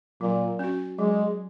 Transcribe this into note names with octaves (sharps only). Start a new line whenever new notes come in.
A#2 F#3
C#4 F#4
F#3 G#3